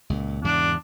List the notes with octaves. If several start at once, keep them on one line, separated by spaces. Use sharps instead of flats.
C#2 A#2
E2 G#2 C#3 D4